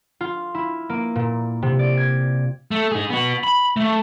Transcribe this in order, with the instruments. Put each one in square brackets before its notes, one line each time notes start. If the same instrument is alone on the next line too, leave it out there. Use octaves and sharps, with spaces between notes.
[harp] F4
E4
A#3
A#2
C3
D5
G#6
[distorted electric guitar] A3
D#4 G#4
B3 F#4
B5
A3